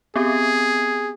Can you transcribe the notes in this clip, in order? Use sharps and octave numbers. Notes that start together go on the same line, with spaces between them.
B3 C4 G4 G#4